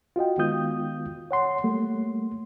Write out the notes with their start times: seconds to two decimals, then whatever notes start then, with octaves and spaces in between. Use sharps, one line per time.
0.16 F4 F#4 D#5 G5
0.38 D#3 G#3 B3 F4 D#6 G6
1.31 C#5 F#5 C6
1.64 G3 A3 A#3